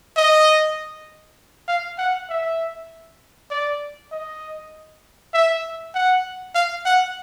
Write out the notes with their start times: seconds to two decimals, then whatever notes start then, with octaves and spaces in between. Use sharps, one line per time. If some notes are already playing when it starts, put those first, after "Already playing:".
0.17 D#5
1.68 F5
1.98 F#5
2.29 E5
3.50 D5
4.12 D#5
5.34 E5
5.94 F#5
6.54 F5
6.85 F#5